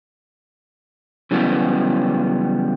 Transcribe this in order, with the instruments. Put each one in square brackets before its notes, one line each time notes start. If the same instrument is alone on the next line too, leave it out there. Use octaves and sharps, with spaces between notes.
[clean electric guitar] C#3 E3 F#3 G3 B3 C#4